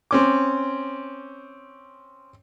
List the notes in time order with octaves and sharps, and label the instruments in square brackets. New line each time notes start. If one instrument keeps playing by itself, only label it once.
[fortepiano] C4 C#4 D6